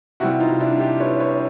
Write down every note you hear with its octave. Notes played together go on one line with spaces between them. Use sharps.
C3 E3 G3 E4 F#4
D#4 F4
D4 E4
F4 G4
B4 C#5
B4 C#5